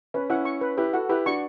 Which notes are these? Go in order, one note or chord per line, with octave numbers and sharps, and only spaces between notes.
C#4 B4
C#4 E4 F#5
C#6
B4
E4 G4 B4
F#4 A4 F#5
E4 G4 B4
D4 F#4 C#6